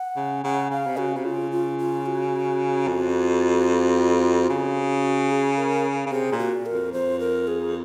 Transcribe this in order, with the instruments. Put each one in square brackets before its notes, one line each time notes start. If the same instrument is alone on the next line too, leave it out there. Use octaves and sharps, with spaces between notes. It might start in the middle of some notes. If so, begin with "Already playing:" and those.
Already playing: [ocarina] F#5
[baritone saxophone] C#3
[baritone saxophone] C#3 [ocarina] F#5
[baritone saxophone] C#3 [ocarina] F5
[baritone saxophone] C3
[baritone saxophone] C#3 [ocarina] F#4
[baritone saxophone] C3 [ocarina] F#4
[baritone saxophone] C#3 [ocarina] F4
[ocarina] F4
F4
F#4
[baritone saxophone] F2
C#3
[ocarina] G#4
A#4
[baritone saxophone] C#3
[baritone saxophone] C3 [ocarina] G#4
[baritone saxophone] A#2
[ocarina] F#4
A#4
[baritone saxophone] F2
[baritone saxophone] F2 [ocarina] C5
[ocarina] A#4
G#4